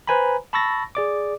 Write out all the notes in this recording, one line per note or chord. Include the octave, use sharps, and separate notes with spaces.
B4 C5 G#5 A#5 B5
A5 B5 C#6 E6 A6 A#6
G#4 D5 D6